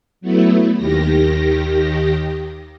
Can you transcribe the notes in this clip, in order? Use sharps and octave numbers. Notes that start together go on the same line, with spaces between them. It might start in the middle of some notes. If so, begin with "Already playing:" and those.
F#3 A3 B3 E4
D#2 D#3 G4 A#6